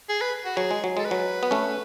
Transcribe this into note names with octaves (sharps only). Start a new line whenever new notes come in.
G#4
B4
F#4
F#3 G#4
G#3
F#3
G#3 A4
B4
F#3
B3
A3 C#4